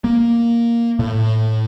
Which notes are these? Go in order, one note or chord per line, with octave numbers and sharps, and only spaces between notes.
A#3
A2